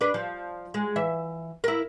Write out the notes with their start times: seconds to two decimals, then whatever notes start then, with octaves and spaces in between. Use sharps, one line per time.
0.01 D4 B4
0.14 F3
0.74 G#3
0.96 E3 E5
1.64 E4 A#4